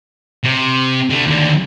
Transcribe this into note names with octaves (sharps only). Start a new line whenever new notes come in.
C3
D3 A3
D#2 D3